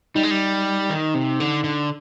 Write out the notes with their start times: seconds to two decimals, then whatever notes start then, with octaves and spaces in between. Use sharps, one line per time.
0.15 G3 D#4
0.23 G#3
0.31 G3
0.90 D#3
1.14 C3
1.40 D3
1.64 D3